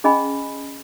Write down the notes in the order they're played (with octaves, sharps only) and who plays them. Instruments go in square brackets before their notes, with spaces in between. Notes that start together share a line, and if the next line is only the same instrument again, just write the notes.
[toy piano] C#4 G#4 D#5 G#5 B5